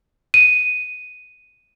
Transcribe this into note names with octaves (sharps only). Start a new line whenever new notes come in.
D#7